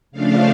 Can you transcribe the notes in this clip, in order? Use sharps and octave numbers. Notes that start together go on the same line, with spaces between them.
C#3 F3 A3 D4 F5